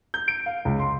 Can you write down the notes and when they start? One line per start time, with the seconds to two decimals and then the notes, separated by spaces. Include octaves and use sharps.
0.14 G6
0.28 D7
0.46 F5
0.65 C#2
0.79 C6